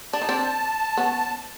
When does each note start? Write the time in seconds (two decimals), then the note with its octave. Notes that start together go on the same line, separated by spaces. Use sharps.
0.13 D4 A5
0.22 D#4
0.29 C4 D4
0.97 B3 C#4